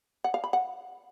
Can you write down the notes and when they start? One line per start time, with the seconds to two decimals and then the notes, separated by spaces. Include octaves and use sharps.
0.24 F#5
0.34 F5
0.44 B5
0.53 F#5